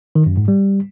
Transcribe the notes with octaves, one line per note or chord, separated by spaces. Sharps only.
D#3
F#2
G#2
G3